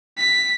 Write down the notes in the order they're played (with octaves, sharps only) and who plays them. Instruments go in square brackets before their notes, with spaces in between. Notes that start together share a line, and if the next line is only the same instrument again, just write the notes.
[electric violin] B6